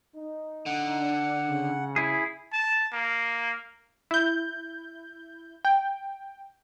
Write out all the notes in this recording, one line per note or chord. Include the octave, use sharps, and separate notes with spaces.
D#4
D3 F#5
D4
C#3
E4 G#4
A5
A#3
E4 G6
G5